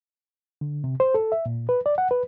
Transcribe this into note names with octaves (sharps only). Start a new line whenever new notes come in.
D3
C3
C5
A4
E5
A#2
B4
D5
F#5
B4